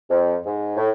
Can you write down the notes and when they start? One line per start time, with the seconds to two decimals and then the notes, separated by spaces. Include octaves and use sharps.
0.10 F2
0.46 G#2
0.77 A2